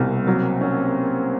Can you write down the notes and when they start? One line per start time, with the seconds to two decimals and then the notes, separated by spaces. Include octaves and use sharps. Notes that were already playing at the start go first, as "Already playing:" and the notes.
Already playing: C2 B2 A#3 C4
0.27 F#3
0.61 C#4